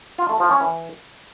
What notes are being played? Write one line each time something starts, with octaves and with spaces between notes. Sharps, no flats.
F4
A3
F3
C#4
E3